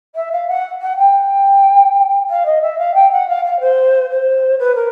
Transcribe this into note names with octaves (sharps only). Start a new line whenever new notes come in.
E5
F5
F#5
F#5
G5
F5
D#5
E5
F5
G5
F#5
F5
F5
C5
C5
B4
A#4